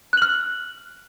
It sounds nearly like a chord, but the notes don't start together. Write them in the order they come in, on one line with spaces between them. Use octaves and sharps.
F#6 F#7 F6